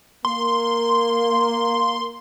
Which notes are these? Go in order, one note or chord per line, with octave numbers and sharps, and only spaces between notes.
A#3 C6